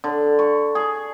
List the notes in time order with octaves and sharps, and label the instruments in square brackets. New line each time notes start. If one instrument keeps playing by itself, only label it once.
[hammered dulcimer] D3
C#6
G#4